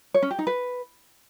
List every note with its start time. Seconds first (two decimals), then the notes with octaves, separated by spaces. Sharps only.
0.14 C#5
0.23 C#4
0.31 G4
0.39 D#4
0.47 B4